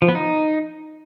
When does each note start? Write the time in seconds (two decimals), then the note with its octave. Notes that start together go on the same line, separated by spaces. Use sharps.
0.02 F3
0.08 B3
0.15 D#4